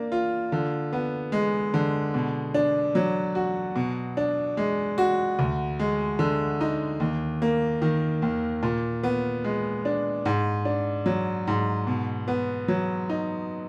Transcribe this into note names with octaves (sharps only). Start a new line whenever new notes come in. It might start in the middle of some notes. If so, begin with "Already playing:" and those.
Already playing: A#3 D4
F4
D3
B3
G#3
D3
B2
D4
F#3
F#4
B2
D4
G#3
F#4
D2
G#3
D3
D#4
D#2
A#3
D#3
D#2
A#2
B3
G#3
D4
G#2
D4
F#3
G#2
B2
B3
F#3
D#4